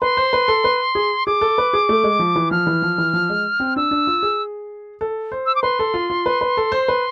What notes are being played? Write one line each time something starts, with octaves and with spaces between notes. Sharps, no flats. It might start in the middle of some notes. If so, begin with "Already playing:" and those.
B4 C6
C5
B4
A4
B4
G#4
G#4 D6
A4
B4
G#4
A3
G#3
F3
E3
F3 F6
E3
F3
E3
F3
G#3
C4
D4 E6
D4
F4
G#4
A4
C5
E6
D6
B4 C6
A4
F4
F4
B4
B4
A4
C5
B4